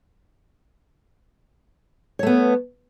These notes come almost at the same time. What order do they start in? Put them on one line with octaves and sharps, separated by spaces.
C#5 A3 B3